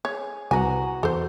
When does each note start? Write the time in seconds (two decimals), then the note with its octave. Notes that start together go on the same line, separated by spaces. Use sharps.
0.05 G#4 C#5
0.51 C2 F#4 B4 F#5 G#5 A#5
1.03 E2 A4 C5